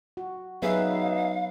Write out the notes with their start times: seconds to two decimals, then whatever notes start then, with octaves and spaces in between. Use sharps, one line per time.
0.17 F#4
0.62 F#3 B3 D#4 G#4 B4 E5 F5